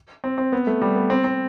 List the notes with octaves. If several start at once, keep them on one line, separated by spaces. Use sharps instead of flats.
C4
C4
B3
A3
G3
B3
C4
C4